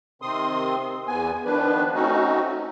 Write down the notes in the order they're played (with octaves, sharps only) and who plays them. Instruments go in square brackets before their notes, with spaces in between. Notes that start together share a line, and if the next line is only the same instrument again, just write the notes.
[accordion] C3 D#3 C4 C6 D#6
E2 B3 G#5
D#3 F3 B3 D4 B4
A3 C4 C#4 D#4 F#4